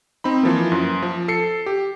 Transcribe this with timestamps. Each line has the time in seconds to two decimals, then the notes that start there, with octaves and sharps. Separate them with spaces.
0.24 C4 D#4 B5
0.43 E3 F3 A#3
0.72 F#2
1.02 F3
1.28 A4 C7 C#7
1.66 G4